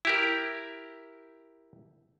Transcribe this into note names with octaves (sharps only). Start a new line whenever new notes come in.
E4 G4 A#4